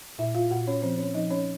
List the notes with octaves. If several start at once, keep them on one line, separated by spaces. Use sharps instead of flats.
A#2 E4 E5
F4 F5
A#2 F#4 F#5
C#4 C#5
F3 C4 C5
C#4 C#5
F3 D#4 D#5
C#4 C#5